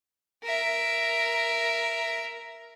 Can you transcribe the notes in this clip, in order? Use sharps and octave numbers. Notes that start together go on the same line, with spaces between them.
A#4 E5